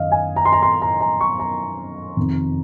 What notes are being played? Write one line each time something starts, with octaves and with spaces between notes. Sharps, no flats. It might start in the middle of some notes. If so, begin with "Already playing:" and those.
Already playing: F#2 D#3 D#5 F5
G#5
A#5
C6
A#5
C6
A#5
A#5
C#6
A#5
F2 C3 D#3